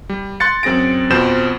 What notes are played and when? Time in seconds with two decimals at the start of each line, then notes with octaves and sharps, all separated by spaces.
0.09 G3
0.40 C6 F#6 A6 C#7
0.63 F#2 C4 G#4 A#6 D7
1.10 F2 B2 C5 G6 E7